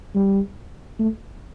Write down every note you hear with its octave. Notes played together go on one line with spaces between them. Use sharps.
G3
A3